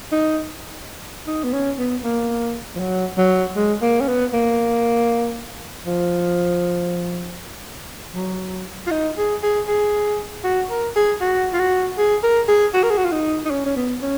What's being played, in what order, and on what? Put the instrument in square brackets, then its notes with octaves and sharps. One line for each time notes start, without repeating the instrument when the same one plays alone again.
[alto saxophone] D#4
D#4
B3
C#4
B3
A#3
F3
F#3
F#3
G#3
A#3
C#4
B3
A#3
F3
F#3
F4
D#4
G#4
G#4
G#4
F#4
A#4
G#4
F#4
F4
F#4
G#4
A#4
G#4
F#4
A#4
G#4
F#4
F4
D#4
D#4
C#4
C#4
B3
C#4